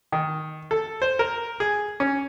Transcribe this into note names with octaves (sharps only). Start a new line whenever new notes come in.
D#3
A4
C5
A#4
G#4
C#4